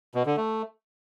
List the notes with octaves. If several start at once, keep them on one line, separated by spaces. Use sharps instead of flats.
B2
D3
A3